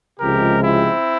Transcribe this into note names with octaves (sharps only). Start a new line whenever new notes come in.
C#2 C3 F3 G#3 G4 A#4
C4 E4